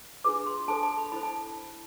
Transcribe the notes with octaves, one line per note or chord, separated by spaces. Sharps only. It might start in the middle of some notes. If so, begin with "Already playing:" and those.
D4 F4 G#4 B4 D6
C6
D4 A4 C5 A5
A5
B5
E4 A4 C5 B5
A5